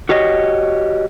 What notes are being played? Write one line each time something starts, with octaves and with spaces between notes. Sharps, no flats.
F#4 G4 C#5 D#5